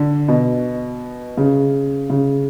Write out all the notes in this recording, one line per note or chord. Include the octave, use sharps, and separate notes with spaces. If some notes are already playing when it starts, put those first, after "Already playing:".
Already playing: D3
B2
C#3
C#3